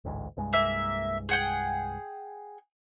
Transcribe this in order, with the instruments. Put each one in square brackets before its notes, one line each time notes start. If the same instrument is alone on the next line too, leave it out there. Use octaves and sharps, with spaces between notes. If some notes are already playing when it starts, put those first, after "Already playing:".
[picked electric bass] A1 D2 G#2
C2 G2 G#3
[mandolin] A#3 E5
G#4 F#5 G5